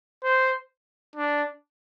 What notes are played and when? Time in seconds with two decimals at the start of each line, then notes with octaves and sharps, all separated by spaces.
0.23 C5
1.16 D4